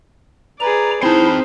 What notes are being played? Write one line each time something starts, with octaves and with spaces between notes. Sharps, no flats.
G#4 B4 D5 A#5
C4 D#4 E4 C5 A5